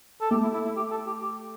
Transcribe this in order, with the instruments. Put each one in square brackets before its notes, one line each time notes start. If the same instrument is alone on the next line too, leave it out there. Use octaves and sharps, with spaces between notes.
[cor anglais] A4
[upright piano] A3 [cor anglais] G4
[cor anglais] E4
E4
E4
G4
A4
G4
G4